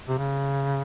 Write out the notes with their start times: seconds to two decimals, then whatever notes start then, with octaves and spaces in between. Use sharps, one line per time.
0.09 C3
0.18 C#3